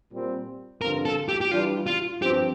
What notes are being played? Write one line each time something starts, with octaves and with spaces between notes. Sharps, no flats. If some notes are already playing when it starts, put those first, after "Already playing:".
A#2 G3 C4
G2 D3 F3 C4 F4 A#4
A4
G4
G4
E3 G3 D4 F4
F4
G2 F3 C4 G4